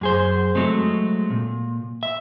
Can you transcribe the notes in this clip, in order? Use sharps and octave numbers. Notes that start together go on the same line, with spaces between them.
F#2 G#4 C5
F#3 G#3 A3 C4
A#2
E5